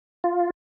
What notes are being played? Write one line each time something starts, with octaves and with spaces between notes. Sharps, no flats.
F4